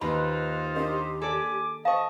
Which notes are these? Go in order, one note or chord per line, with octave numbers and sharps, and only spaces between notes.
D#2 D#4 F4 B4 C5 B5
D4 G4 A#4 D#5
A4 D5 G#5 D6
C5 D#5 F5 A5 C#6